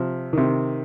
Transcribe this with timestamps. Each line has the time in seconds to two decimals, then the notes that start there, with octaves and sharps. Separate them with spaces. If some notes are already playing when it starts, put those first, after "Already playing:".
Already playing: C3 F3
0.33 C3 D#3